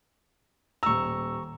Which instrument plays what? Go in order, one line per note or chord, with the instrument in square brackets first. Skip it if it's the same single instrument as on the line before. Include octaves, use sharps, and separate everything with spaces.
[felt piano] D#1 E6 [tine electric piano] A#5 C#6